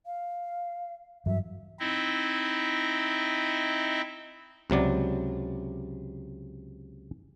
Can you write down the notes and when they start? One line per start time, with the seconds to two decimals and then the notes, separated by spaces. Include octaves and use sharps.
0.05 F5
1.26 G2 E3 F#3 E5
1.79 C4 D#4 E4 D#5 E5
4.70 C#2 C3 F#3 D5